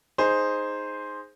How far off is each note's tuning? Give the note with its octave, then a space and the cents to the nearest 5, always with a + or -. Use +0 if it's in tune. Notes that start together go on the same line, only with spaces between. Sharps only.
D#4 +0 G#4 +0 C5 +0